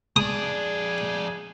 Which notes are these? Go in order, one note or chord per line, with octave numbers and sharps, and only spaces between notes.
F2 G#4 D5 D#6